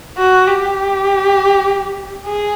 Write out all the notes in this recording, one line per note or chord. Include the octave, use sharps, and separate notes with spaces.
F#4
G4
G#4